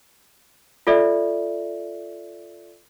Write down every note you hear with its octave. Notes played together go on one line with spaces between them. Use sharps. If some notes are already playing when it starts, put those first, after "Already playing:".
F4 A4 D5 E5